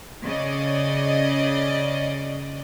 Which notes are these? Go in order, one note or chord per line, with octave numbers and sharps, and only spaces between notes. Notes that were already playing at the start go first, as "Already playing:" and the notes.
C#3 D5 D#5